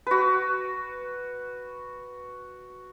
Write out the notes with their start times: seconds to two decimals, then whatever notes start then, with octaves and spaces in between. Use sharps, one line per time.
0.07 F#4 B4